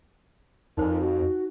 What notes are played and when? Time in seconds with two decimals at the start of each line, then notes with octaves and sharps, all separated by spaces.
0.77 F2 D#4 A#4 C5 G#5
1.00 F#4